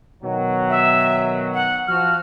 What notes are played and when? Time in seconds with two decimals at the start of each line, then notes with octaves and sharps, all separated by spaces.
0.23 B2 D#3 F#3
0.70 E5
1.54 F#5
1.88 F3 F#4 F6